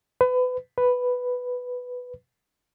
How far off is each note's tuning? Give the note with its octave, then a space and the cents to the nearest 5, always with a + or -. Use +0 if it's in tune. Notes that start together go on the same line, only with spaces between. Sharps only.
B4 +30
B4 +5